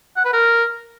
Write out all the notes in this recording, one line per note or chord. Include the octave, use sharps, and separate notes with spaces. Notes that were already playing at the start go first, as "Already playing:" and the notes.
F#5
B4
A#4